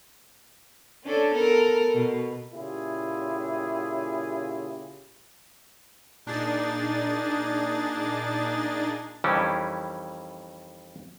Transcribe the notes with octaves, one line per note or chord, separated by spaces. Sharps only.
C#4 D4 A4
B3 A4 A#4
B2
A#2 C#3 E4 F4 G4 G#4
A#2 D4 D#4 G#4 A6
F2 D#3 E3 G3 C#4